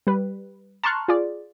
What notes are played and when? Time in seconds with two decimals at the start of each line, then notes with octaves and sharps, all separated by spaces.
0.07 G3 B4
0.83 A5 A#5 C6 C#6 F6 F#6
1.08 F4 G#4 D5